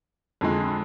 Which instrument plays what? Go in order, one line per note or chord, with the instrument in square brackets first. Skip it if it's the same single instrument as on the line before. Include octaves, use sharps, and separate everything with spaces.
[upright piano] F2 D3 G#3